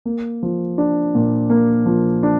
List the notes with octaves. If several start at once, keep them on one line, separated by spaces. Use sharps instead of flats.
A#3
F3
D4
A#2
A#3
F3
D4